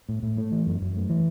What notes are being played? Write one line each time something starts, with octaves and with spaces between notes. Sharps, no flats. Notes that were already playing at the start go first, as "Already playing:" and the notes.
A2
A2
A3
E3
F#2
F#2
A3
E3